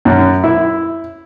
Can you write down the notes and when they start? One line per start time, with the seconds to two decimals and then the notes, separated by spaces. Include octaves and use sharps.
0.05 F#2
0.44 E4